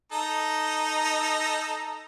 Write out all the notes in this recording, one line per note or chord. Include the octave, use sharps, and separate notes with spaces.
D#4 A4 A#5